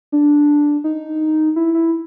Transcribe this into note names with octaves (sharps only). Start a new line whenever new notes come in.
D4
D#4
E4
E4